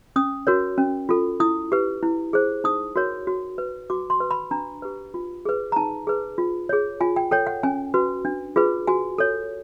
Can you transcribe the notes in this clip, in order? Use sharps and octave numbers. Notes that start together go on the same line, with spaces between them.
C#4 D#6
F#4 A#4 C#5
C#4
F4 A4
E4 D#6
G4 B4
E4
G#4 C5
D#4 D#6
F#4 A#4 C#5
F#4
B4
F#4 D6
C6
B4
B5
D4 A#5
G4 B4
F4
G#4 B4
A#5
D#4 A5
G#4 B4
F4
G#4 C#5
F4 G#5
G5
A4 C#5 G5
F#5
C#4 G#5
F#4 B4
D4
F4 G#4 B4
F#4 G#5
A4 C#5